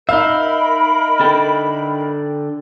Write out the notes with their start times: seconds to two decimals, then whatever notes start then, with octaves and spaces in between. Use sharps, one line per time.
0.09 D#4 A#4 E5 F5 B5
1.20 D3 A4 G5